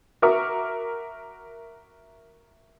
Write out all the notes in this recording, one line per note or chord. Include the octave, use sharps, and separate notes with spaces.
F#4 A#4 E5 D6